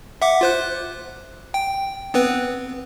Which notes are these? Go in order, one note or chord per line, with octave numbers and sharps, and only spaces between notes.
E5 F#5 D6
F4 C5 F#6
G5
B3 C4 B4